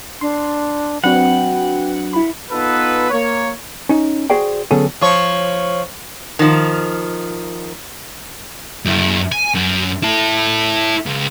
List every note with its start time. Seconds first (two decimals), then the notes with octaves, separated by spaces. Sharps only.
0.21 D4 C6
1.04 F#3 C4 D4 F#4 B4 F#5 G5
2.13 E4 B5
2.51 B3 D#4 F4 A4 B4
3.11 A#3 C#5
3.89 C#4 D#4
4.30 F#4 G#4 C5 D5 G5
4.71 D3 F#3 B3 C#4 G#4 A4
5.01 F3 C#5
6.39 D#3 F3
8.85 F#2 E4
9.32 G#5
9.55 F#2
10.03 E4 A4
11.06 C#2